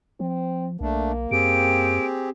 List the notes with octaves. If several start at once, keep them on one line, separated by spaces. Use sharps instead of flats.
F3 C4
B1 A3 A#3 D4
F#2 C4 G4 G#4 D7